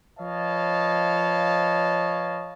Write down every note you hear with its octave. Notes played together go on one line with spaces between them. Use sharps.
F3 B4 C#5 D#5 F5 A5